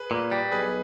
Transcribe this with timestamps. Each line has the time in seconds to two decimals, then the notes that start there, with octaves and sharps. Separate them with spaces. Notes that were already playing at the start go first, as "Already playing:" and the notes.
Already playing: G#4 B4
0.11 A#2
0.31 G3
0.52 B1 G#4 B4